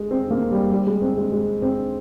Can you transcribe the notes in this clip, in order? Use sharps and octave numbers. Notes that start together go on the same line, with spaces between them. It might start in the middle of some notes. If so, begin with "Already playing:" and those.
Already playing: G#3
C4
A#3
G3
G3
G#3
C4
G#3
G#3
C4